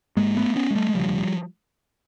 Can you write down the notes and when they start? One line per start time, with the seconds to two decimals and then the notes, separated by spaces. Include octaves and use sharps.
0.16 G#1 G#2 G#3 A#3
0.37 A3 B3
0.55 B3 C#4
0.71 G#3
0.75 G3 A3
0.89 G#3
0.94 E1 D2 C#3 F3 G3